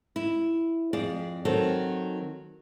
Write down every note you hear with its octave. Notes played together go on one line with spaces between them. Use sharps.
E4
F2 G#4 D5
D#3 F#3 C4 A4